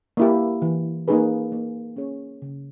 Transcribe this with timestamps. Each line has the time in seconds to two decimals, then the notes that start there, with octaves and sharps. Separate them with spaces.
0.17 A#3 E4 G4
0.62 E3
1.08 A#3 D#4 G#4 B4
1.52 A#3
1.96 C#4 G#4 C#5
2.42 C#3